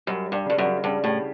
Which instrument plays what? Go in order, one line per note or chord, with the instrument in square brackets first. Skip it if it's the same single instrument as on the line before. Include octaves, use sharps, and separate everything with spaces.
[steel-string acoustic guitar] F#2 [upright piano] G3
[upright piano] G3
[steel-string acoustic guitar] G2
[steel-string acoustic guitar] G2 [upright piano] C#3
[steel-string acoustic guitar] F#2
[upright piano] C#3
[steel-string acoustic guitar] G2 [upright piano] C#3
[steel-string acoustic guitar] A2 [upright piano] G4